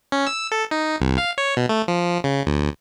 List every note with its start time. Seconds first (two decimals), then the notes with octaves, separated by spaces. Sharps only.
0.12 C#4
0.27 E6
0.52 A4
0.71 D#4
1.00 C2
1.18 F5
1.38 C#5
1.57 B2
1.69 A3
1.88 F3
2.24 C#3
2.46 D2